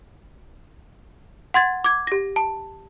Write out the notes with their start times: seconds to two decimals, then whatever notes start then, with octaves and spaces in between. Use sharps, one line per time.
1.54 F#5 C6 G#6 A6
1.84 D6 G#6
2.07 G4 A#6
2.36 A5